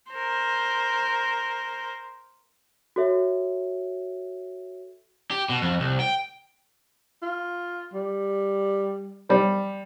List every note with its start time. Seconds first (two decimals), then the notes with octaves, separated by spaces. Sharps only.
0.12 A#4 C5
2.96 F#4 A4 C#5 E5
5.31 G4
5.49 B2
5.61 F2
5.80 C2
6.00 G5
7.23 F4
7.94 G3
9.29 G3 C5